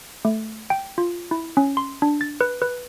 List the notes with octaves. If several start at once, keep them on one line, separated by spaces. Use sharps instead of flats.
A3
G5
F4
E4
C#4
C6
D4
A6
B4
B4